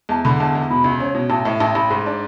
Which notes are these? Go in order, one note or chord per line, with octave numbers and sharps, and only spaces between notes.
E2 A5
D3 B5
E2 A5
E2
B2 B5
C#2
C#4
B2
A1 A5
A2
A1 A5
A1 B5
G#2
D4